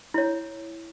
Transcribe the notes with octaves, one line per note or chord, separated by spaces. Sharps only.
E4 C#5